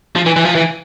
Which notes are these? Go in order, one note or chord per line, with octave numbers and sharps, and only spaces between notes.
F3
E3
E3
F3
E3